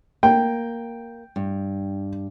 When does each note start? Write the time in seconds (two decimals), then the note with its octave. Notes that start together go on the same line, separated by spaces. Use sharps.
0.23 A#3 G5
1.36 G2